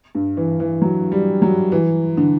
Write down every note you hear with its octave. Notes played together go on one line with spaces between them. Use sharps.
G2
E3
E3
F#3
G3
F#3
E3
D3